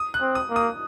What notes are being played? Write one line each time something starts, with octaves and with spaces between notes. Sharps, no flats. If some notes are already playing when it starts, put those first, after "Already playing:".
Already playing: D#6
F#6
C4
D#6
A#3
D#6